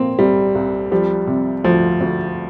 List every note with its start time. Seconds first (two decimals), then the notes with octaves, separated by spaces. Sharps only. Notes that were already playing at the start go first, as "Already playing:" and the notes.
Already playing: A#2 F3 A#3 C4
0.19 C2 G3
0.55 C2
0.91 F3 G3
1.27 C3
1.64 D2 F3
2.01 D2